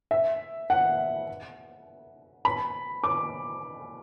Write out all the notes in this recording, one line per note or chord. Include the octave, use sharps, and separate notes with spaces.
E5
F#5
B5
D6